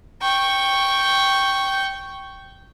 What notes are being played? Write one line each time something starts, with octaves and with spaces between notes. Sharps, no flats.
G5 C#6